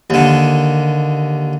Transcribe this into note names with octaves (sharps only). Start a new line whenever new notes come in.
D#2 D3